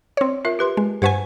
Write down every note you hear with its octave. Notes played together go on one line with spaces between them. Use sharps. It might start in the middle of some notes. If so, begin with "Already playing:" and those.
C4 C#5
F4 A#4 E5
G4 B4 C6
G#3
G2 B4 C5 F#5 G#5 C#6